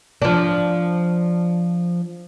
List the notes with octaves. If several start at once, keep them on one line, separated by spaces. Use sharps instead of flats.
F3 D4